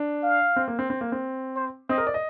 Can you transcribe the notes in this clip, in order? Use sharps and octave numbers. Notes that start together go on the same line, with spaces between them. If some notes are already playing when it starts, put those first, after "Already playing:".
Already playing: D4
F5
C4
A#3
C4
C4
A#3
C4
C5
C4 D#5
A#4
D5
D#5